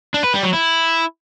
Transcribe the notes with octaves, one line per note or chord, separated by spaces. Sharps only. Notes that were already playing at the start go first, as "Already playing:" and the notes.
D4
B4
G3
F#3
E4